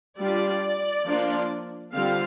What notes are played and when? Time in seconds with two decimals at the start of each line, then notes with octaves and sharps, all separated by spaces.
0.20 G3 D4 F4 D5
1.06 F3 A#3 D4 F4
1.92 D3 G3 C4 F4 F5